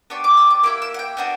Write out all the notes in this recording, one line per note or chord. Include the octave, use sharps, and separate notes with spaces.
B3 D4 G4 C#6
D6
E6
D6
A#3 E4 G4 D6
E6
F#5
G5
B3 D4 F#4